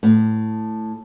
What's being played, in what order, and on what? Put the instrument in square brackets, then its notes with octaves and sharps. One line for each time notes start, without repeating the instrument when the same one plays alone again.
[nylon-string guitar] A2